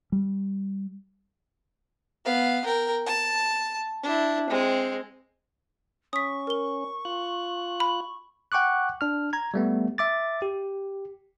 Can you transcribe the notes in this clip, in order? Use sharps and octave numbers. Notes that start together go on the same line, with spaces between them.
G3
B3 F5
A#4 G5
A5
D4 E4
G#3 C4
C#4 C#6 D#6 B6
A#4 G7
F4 F#6
B5
F#5 G5 C#6 D6 F#6
D4 F6
A#5 G#6
G3 A3 B3
E5 D6 A6
G4